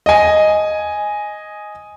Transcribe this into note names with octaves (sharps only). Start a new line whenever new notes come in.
D#5 G#5